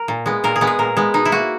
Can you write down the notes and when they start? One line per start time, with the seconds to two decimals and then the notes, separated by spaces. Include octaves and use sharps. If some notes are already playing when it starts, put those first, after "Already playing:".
Already playing: A#4
0.08 A#2
0.26 G#3 B3
0.44 A#2 A#4
0.56 G#4
0.61 G#3 B3
0.67 G#4
0.79 A#2 A#4
0.97 G#3 B3
1.14 B2 D#4
1.25 E4
1.32 A#3 F#4